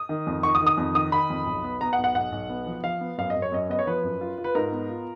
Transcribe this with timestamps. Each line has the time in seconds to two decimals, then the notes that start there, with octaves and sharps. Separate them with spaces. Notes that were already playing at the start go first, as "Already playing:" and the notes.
Already playing: D#6
0.09 D#3
0.27 F2
0.43 D#3 C#6
0.55 D#6
0.61 D#3
0.67 D#6
0.78 F2
0.95 D#3 D#6
1.12 D#3 B5
1.30 F2
1.46 B1
1.64 B3
1.81 B3 A#5
1.93 F#5
1.98 B1
2.04 F#5
2.15 B1 F#5
2.32 B1
2.49 B3
2.66 F3
2.84 F3 F5
3.01 B3
3.18 F#2 F5
3.30 D#5
3.36 F#2
3.42 C#5
3.52 F#2 D#5
3.69 B3 D#5
3.79 C#5
3.87 F3 B4
4.04 F#2
4.21 F4
4.38 F4
4.44 B4
4.55 G#2 A#4
4.72 B3
4.89 F4